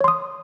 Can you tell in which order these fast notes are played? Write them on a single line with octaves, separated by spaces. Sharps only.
C#5 C6 D#6